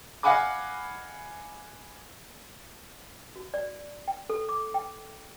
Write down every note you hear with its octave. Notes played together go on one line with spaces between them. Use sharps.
D#5 F5 F#5 G#5 B5 D6
F#4
D5
G5
A4
D6
G5